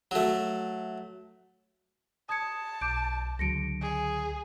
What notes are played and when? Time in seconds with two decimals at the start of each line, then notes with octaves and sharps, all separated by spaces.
0.11 F#3 A3
2.29 A5 D#6 G#6 C#7
2.81 B1 D6 G6 D7
3.39 C#2 D3 F#3 A#6 C#7 D7
3.82 G#4